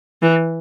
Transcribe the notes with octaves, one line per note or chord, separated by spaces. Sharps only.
E3